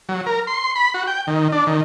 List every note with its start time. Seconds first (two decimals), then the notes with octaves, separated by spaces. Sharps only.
0.09 F#3
0.26 A#4
0.47 C6
0.75 B5
0.94 F#4
1.07 G5
1.27 D#3
1.52 D4
1.67 D#3